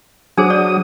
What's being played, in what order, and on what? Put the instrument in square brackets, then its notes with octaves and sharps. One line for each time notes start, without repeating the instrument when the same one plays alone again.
[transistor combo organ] F#3 D#6 [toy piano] D4 G#4 C5
[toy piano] D5